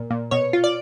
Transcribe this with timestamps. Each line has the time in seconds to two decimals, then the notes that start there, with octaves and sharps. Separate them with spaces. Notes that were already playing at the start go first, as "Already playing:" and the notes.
Already playing: A#2
0.10 A#2
0.31 B2 C#5
0.53 F4
0.64 D5